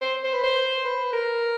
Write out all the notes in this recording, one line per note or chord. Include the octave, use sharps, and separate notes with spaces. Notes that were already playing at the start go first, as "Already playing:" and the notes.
C5
C5
B4
C5
B4
A#4